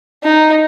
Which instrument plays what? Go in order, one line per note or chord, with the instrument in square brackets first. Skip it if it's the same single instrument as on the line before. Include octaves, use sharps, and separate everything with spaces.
[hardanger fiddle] D#4